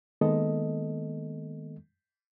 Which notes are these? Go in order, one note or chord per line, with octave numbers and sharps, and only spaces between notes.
D#3 G#3 A#3 B3 A4 D#5